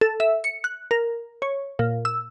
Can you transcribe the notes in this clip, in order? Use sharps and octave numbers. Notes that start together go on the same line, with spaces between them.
A4
E5
C#7
F#6
A#4
C#5
A#2
E6